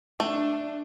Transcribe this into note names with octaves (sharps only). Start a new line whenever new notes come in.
A3 D4